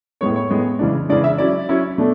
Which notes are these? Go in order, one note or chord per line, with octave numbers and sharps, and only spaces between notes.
A2 G#3 B3 C#5
C#5
A2 G#3 B3
C#3 E3 G#3 D4
C#3 E3 G#3 D4 D5
E5
F#3 C#4 E4 D5
F#3 C#4 E4
B2 A3 D4